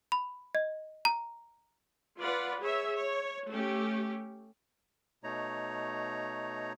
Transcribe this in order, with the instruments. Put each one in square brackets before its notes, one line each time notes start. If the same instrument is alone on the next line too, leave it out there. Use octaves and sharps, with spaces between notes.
[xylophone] B5
D#5
A#5
[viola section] F4 B4 D5 F#5
G#4 C#5 E5
C#5
A3 C#4 G4
[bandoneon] B2 A3 D#4 C#5 A#5